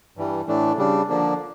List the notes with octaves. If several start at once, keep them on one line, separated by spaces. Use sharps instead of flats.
G2 E3 G3
A2 E3 A3 D4
C#3 G3 D4
D3 F3 A#3 D4